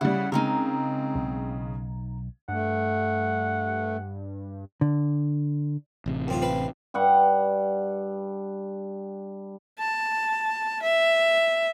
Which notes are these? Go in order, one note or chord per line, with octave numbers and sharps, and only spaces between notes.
C#3 G3 E4 F#5
C#3 G#3 C4 D#4 E4 A#4
B1
G2 A3 F#5
D3
A1 C3
F#2 C4 F4
C4 B4 F5
G2 G3 F#5 C#6
A5
E5